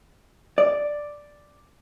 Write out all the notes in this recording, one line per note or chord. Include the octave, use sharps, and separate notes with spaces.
D5